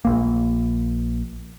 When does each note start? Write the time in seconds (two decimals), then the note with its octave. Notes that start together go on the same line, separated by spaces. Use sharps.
0.05 A#1 A#3